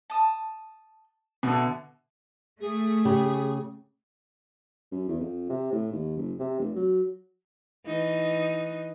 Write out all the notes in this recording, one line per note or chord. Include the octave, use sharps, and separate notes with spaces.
A5 D#6
B2 D3 A3
A3 G#4
C#3 G4
F#2
E2
F2
C3
A2
D#2
F#1
C3
F1
F#3
E3 D#4